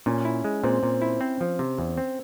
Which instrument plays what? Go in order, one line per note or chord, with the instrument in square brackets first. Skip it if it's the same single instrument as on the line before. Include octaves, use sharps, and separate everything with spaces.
[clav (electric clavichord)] A#2 [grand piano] C#4
[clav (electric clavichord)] E4
G#3
[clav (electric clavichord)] A#2 [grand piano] C4
[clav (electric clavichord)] A#2
E4
C4
F3
C3
E2
C4